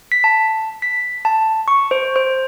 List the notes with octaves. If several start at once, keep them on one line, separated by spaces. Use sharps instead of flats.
B6
A5
B6
A5
C#6
C5
C5